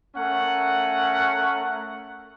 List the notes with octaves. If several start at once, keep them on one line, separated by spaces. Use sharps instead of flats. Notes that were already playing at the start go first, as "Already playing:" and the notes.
A3 C#4 A#4 F#5